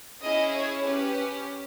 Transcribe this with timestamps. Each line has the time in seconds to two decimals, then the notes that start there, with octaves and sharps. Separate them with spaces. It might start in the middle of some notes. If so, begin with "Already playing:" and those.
0.23 C#4 E4 G#4 D#5
0.54 C#5
0.86 C#4 G4 B4